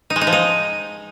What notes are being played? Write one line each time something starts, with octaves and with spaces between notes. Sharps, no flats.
D#4
G#3
D#4
F3
D#4